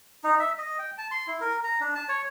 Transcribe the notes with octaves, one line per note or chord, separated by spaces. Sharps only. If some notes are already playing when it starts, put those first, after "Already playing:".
D#4
E5
D#5
G5
A5
C6
E4
A#4
A#5
D4
A5
C#5